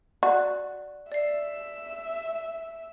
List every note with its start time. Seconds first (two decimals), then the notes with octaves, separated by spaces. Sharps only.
0.23 F#4 D5 F#6
1.12 D5 E5 C7